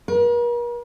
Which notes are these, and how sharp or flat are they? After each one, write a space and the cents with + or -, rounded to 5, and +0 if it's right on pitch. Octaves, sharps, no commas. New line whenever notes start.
A#4 +45